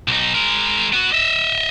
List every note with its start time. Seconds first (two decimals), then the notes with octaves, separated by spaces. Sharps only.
0.08 B1 D#4
0.34 G#3 A#4
0.93 B3 F#4
1.13 D#5 E5